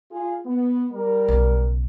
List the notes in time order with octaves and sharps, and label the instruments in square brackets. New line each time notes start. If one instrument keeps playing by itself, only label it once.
[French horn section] F4 G#4
B3
G3 A#4
[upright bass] B1 C#3